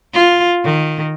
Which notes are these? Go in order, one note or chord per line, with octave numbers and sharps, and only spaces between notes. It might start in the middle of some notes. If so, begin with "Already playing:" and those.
F4
D#3